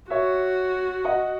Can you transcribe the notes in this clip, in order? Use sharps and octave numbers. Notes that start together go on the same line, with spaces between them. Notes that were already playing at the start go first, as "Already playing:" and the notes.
F#4 C#5 E5
D#5 F#5